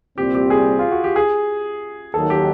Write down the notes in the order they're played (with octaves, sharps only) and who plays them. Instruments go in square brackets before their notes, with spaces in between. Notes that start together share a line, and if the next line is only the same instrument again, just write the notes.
[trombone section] C2 A#2 G3 C4 [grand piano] G4
[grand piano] G4
G#4
F4
F#4
G4
G#4
[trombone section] D#2 D#3 F#3 [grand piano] A4
[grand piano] G4